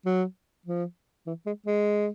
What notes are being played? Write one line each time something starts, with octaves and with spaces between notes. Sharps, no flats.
F#3
F3
E3
G#3
G#3